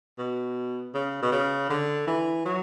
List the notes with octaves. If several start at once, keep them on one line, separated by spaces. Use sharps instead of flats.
B2
C#3
B2
C#3
D3
E3
F#3